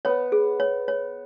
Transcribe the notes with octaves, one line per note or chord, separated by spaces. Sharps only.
B3 C#5
G#4
C#5
C#5